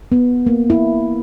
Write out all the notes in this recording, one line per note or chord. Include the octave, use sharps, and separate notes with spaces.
B3
A#3
E4